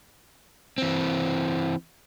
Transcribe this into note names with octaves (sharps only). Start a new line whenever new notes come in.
E3 C4